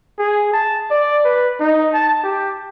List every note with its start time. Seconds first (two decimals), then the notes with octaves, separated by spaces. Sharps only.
0.19 G#4
0.53 A5
0.91 D5
1.25 B4
1.60 D#4
1.93 A5
2.23 G4